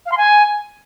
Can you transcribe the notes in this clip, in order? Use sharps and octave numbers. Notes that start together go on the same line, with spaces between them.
F5
C6
G#5